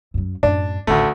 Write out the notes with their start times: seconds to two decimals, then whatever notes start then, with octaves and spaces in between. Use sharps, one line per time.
0.14 F#2 F#3
0.43 F#2 A2 D4
0.87 A1 D2 A3